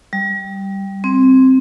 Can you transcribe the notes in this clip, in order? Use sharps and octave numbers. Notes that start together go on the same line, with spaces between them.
G3
C4